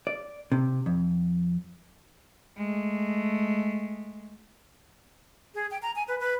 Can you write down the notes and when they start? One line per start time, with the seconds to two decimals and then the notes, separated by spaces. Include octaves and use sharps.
0.07 D5
0.52 C3
0.86 F2
2.57 G#3 A3
5.55 G#4
5.71 G5
5.82 A#5
5.96 G#5
6.08 B4
6.20 B4